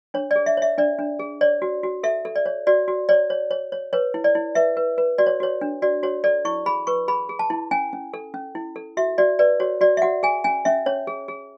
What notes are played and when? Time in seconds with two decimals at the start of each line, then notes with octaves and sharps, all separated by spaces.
0.14 D4 C#5
0.31 D5
0.36 G#4
0.46 E5
0.57 C#5 E5
0.78 D4 D5
0.99 D4
1.19 G#4
1.41 C#5 D5
1.62 F#4
1.83 F#4
2.03 A4 E5
2.25 A4
2.36 D5
2.46 C#5
2.67 F#4 D5
2.88 F#4
3.09 C#5 D5
3.30 C#5
3.51 C#5
3.72 C#5
3.93 B4 C#5
4.14 E4
4.24 D5
4.35 E4
4.55 B4 E5
4.77 B4
4.98 B4
5.18 F#4 D5
5.26 C#5
5.40 F#4 C#5
5.61 D4
5.82 F#4 D5
6.03 F#4 C#5
6.24 A4 D5
6.45 E4 C#6
6.66 G#4 B5
6.87 B4 C#6
7.08 G#4 B5
7.29 G#4
7.39 A5
7.50 E4
7.71 C#4 G#5
7.93 C#4
8.14 A4
8.34 C#4
8.55 E4
8.76 A4
8.97 F#4 E5
9.18 F#4 D5
9.39 B4 D5
9.60 F#4 C#5
9.81 F#4 D5
9.97 E5
10.02 F#4 F#5
10.23 G#4 G#5
10.44 C#4 G#5
10.65 C#4 E5
10.86 C#4 C#5
11.07 G#4
11.28 G#4